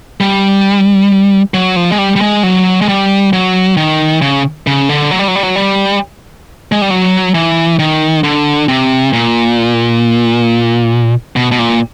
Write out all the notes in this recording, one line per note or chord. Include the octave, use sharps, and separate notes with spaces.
G3
F#3
F3
G#3
G3
G3
G#3
F#3
G#3
G3
F#3
D#3
C#3
C#3
D3
F#3
G3
F#3
G3
F#3
G3
G#3
G3
F#3
E3
D#3
D3
C3
A#2
B2
B2
A#2